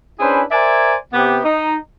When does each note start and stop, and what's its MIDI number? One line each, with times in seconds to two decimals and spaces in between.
0.20 0.42 61
0.20 0.42 62
0.20 0.42 64
0.20 0.42 68
0.20 0.42 71
0.20 0.42 72
0.51 0.96 70
0.51 0.96 72
0.51 0.96 74
0.51 0.96 76
0.51 0.96 80
1.13 1.40 48
1.13 1.40 59
1.13 1.40 67
1.44 1.76 63